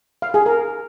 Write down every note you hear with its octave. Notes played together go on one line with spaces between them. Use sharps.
F5
G#4
A#4